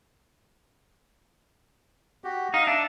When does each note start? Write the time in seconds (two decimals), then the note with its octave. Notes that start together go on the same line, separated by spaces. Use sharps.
2.24 F#4 G4
2.54 D#4 F5
2.67 D4 E5